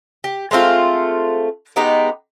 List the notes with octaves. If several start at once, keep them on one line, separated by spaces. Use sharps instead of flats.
G4
G#3 A3 C4 F4
G#3 B3 D#4 G4